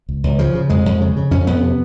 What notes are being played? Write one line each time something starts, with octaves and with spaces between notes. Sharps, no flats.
C#2
C#2
C#3 F3
C#3
F2 G#3
F2
C#3
C#3
F2 C#4
F2 B3
C3